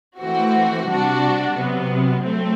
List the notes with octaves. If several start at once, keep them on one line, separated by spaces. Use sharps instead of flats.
E3 A3 C4 F#4
C3 G3 D4 F#4
C3 F#3 B3
F#3 A3 C4